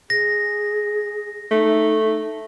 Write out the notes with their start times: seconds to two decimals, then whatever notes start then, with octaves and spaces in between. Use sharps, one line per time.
0.10 G#4 A#6
1.51 A3 D#4